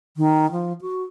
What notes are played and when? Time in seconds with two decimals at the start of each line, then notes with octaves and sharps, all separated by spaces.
0.17 D#3
0.52 F3
0.81 F#4